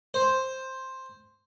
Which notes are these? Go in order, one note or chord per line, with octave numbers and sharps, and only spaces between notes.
C5